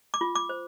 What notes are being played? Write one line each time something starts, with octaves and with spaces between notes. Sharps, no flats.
D6
F4
D6
C5